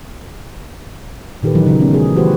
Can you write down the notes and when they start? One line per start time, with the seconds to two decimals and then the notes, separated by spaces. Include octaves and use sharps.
1.43 A#2 D#3 G4 A4 B4
1.55 D#3 E3 F#3 D#4 E4
1.66 C#3 F#3 F#4
1.80 A3 B3 C#4
1.94 G#4
2.16 E3 A3 F#4 G4 B4 C5